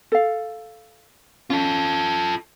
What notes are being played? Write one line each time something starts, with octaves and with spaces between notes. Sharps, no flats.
A4 F5
C#4 F4 A4